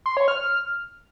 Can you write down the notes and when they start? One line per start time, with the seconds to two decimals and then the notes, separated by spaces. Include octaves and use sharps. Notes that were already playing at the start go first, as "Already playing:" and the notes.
0.06 C6
0.17 C#5
0.28 F6